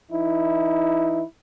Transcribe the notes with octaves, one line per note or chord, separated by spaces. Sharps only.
E3 D#4 E4